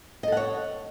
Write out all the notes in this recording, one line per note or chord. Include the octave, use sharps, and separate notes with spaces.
A4 C#5 D#5 F#5